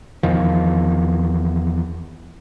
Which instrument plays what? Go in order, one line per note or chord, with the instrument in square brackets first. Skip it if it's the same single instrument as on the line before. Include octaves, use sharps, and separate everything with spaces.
[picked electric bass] E2 D#3 F3